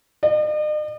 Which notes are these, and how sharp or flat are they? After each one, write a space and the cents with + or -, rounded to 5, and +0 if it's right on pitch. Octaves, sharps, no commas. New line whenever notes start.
D#5 -45